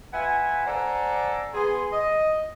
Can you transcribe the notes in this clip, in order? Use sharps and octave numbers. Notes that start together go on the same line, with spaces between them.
F4 B4 E5 F#5 G#5
A4 C5 D5 F#5 G#5 A#5
B3 G#4 C6
D#5